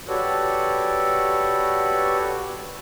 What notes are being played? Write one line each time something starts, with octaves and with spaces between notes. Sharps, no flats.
F#4 G4 A4 B4 C#5 D5